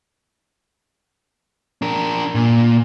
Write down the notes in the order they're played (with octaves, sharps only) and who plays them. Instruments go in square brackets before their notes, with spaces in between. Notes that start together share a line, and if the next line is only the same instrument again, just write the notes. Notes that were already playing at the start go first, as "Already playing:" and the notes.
[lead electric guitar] D4 A#4
A#2